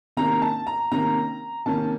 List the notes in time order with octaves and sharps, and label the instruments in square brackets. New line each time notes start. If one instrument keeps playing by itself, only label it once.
[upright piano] C3 D#3 A#3 C#4 A#5
A5
A#5
C3 D#3 A#3 C#4 A#5
C3 D#3 A#3 C#4 A5